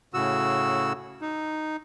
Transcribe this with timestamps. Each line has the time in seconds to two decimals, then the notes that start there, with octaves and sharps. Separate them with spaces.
0.14 A2 C#3 F#4 E6
1.21 D#4